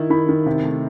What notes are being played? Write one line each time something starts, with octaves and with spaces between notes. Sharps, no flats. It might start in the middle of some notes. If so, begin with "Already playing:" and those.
Already playing: D#3 E4
D#3 B5
D#3
C3
A3